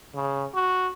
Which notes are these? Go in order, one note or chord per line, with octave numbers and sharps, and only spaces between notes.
C#3
F#4